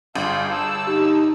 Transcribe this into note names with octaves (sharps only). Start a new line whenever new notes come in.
G1 F4 G#4
A5 E6
D#4 G4